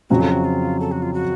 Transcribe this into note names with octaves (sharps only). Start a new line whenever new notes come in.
F2 C#3 F#3 C4 F#4
A4
F#4
F4
A4
F#4
F4
F#4